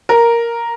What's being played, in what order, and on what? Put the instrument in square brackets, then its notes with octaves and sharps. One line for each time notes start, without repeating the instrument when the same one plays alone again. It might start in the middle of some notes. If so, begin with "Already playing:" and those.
[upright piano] A#4